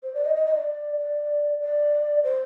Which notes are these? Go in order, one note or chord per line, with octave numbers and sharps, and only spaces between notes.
C5
D5
D#5
D#5
D#5
D5
D5
D5
C5